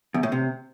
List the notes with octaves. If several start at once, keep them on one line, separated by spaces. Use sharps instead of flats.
E2
A2
C3